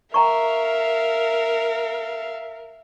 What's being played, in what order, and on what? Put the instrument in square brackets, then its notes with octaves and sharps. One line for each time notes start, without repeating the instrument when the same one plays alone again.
[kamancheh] A#4 [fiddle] E5 F5 [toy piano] G5 A#5 C#6